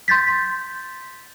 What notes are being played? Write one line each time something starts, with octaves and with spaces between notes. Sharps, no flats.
C6 G6 A6 B6